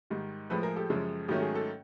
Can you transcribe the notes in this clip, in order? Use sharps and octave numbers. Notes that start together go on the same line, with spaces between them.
G#2 D#3 G3
A2 F3 G#3 A4 B4
G#4 A#4
G4 A4
F#2 C#3 F3 G#3
G#2 D#3 F#3 A3 C#4 G4
G#4
A4